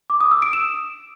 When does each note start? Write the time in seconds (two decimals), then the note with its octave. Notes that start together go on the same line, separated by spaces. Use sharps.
0.10 D6
0.21 D#6
0.31 E6
0.42 D7
0.53 E7